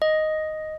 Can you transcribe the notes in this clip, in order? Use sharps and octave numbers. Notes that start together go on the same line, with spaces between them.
D#5